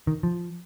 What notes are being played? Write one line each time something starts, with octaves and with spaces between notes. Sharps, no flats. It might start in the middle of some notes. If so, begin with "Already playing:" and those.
D#3
F3